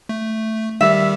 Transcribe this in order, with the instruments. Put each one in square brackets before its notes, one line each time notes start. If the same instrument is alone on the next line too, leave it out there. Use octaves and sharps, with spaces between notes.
[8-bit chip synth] A3
[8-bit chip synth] D#3 G3 G4 [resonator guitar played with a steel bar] E5